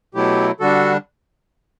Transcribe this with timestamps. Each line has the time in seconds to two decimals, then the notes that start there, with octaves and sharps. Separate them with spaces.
0.14 B2 F#3 A3 E4 G4
0.60 D3 G3 D4 F#4 A4